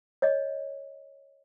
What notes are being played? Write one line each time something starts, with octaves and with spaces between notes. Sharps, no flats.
C#5 D#5